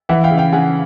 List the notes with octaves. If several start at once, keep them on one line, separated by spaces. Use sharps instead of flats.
E3 E5 F#5
F5 G5
C#3
F5 G5
C#3 F#5 G#5